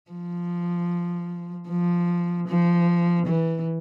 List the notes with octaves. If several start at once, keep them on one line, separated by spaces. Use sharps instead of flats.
F3
F3
F3
E3